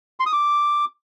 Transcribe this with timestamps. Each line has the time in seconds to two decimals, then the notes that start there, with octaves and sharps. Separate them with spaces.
0.20 C6
0.26 D#6
0.33 D6